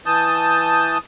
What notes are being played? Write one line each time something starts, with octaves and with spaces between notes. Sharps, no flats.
E3 A5 D#6 G6